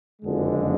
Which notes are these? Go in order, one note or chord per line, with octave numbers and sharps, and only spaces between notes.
F#1 F2 D3 G#3